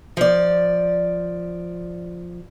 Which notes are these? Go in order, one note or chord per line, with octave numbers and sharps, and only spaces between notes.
F3 D5